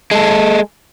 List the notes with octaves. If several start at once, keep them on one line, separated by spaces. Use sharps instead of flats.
G#3 A4